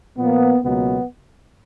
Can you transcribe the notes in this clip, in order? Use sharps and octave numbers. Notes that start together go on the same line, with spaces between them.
A#2 F3 A#3 B3
C#2 B2 F#3 A#3 B3